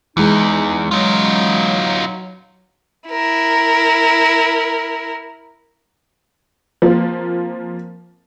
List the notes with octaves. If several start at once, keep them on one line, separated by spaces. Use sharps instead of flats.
E2 E3 G#3 D#4
F#3 D#4 F4
E4 A#4
F3 A#3 C4 F4